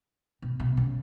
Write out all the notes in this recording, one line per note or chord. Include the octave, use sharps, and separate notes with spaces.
B2
B2
C#3